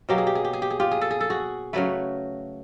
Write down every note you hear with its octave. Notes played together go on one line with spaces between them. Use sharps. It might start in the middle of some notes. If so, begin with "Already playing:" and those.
B2 F#3 A#3 G4
G#4
G4
G#4
G4
G#4
G4
G#4
F4 G4
G#4
A4
G#4
A4
F#4 G#4
C#3 F#3 A3 B4 C#5